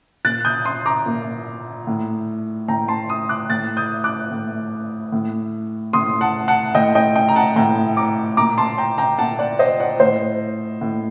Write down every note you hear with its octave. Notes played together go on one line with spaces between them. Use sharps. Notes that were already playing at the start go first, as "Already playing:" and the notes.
A#2 F#6 A6
D#6 G6
C6 D#6
A#5 D6
A#2
A2
A2 G5 A#5
A5 C6
C6 D#6
D6 F#6
A2 F#6 A6
D#6 G6
D6 F#6
A2
A2
A2 C6 D#6
F#5 A5
F#5 A5
A2 D#5 G5
D#5 G5
D#5 G5
A#5
F#5 A5
A2 G5 A#5
A#5 D6
A#2 A#5 D6
A5 C6
G5 A#5
G5 A#5
A#2 F#5 A5
D5 F#5
C5 D#5
D5 F#5
A2 C5 D#5
A2